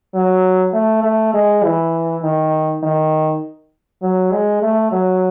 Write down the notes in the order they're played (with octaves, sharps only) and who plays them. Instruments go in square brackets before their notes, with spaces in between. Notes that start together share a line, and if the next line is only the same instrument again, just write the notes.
[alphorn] F#3
A3
A3
G#3
E3
D#3
D#3
F#3
G#3
A3
F#3